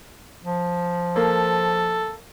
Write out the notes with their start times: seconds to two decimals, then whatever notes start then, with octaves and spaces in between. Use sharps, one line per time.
0.44 F3
1.16 A#3 A4